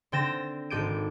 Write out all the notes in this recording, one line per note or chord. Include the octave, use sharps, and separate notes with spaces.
D3 C4 G5 A6 A#6 E7
G#1 A4 D6 G6 D7 D#7